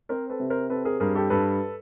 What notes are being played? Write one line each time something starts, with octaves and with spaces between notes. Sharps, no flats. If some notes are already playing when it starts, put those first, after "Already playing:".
C4 A#4 C5
A4 B4
C3
A#4 C5
C4 A4 B4
G#4 A#4
G2 G#4 A#4
G4 A4
G2 A4 B4